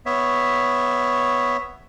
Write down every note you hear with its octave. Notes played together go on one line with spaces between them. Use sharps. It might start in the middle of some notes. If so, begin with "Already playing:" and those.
B3 C#5 E5